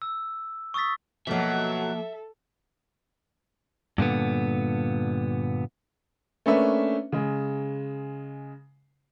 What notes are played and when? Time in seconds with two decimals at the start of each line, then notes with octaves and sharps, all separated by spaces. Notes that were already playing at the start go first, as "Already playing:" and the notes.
0.02 E6
0.74 C#6 D#6 E6 A6 B6
1.27 B2 F3 F#3 A#3 A4 E5
3.98 G2 A#2 D3 B3
6.46 A3 A#3 C#4 D4 B4 E5
7.12 C#3 G#3